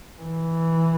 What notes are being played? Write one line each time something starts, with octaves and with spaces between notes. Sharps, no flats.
E3